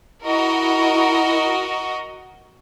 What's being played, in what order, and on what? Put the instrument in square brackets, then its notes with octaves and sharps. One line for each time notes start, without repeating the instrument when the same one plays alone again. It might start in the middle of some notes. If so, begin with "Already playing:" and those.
[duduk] E4 [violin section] F#4 A#4 D#5